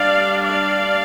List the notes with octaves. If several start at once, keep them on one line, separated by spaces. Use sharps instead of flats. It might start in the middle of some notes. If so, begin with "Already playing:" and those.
Already playing: G3 D4 D5 F5
D5 F5